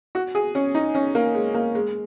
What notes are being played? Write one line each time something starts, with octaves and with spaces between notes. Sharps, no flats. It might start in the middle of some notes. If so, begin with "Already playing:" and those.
F#4
G#4
C#4
D#4
C#4
A#3
G#3
A#3
G#3